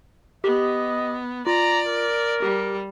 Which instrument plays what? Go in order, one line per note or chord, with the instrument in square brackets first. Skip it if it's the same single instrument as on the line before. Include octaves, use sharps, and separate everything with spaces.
[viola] B3 [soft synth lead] G4 [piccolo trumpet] D#5
[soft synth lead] F4 [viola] D5 [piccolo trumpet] A#5
[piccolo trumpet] A#4
[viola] G3 [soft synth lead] G4